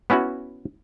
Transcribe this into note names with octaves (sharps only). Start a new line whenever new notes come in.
B3 C#4 E4 F#4